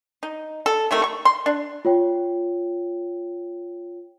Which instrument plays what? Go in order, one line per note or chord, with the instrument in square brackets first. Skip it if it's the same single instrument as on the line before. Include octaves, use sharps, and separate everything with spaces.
[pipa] D#4
A4
C3 D#3 A3
C#6
C6
D4
[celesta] F4 C#5 G5